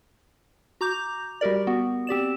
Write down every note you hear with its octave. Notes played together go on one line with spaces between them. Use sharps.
F#4 A#5 D6 G6 F7
G3 F#4 G4 A#4 D5
B3 F#4
C4 G4 D5 E7